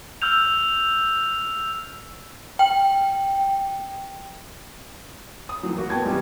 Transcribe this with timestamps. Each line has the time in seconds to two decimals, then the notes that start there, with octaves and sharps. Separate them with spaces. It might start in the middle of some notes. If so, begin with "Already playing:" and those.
0.22 E6 F6 G6 F7
2.59 G5
5.49 D#6
5.63 A2 E3 F#3
5.77 A#3 F#4
5.90 B3 G5 A5 G#6
6.04 C3 E3 G3 G#3